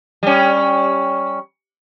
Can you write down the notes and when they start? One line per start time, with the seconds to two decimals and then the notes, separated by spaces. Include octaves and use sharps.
0.23 G3 C#4